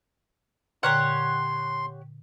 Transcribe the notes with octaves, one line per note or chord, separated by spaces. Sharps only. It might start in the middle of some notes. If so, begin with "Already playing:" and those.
A#2 D3 G4 C#5 F#5 A#5 C6